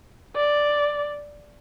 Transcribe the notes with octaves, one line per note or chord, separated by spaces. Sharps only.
D5